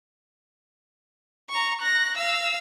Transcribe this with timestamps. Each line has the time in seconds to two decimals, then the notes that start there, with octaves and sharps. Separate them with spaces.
1.50 A#5 C#6
1.82 F#6 A#6
2.18 F5 E6